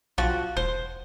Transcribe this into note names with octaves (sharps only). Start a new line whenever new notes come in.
B1 F3 C4 F#4
E1 C5